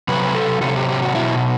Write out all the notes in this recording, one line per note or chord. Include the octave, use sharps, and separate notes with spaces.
C3 F#3 B4
A4
C3 F#3 A4
G4
G4
F#4
B2 F#3 E4